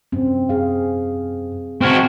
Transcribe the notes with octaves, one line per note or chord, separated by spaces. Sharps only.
F#2 C4
G#4 F5
C4 F#4 C#6 F6 G#6